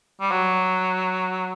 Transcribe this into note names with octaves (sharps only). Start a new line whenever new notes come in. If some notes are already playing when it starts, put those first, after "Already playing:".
G3
F#3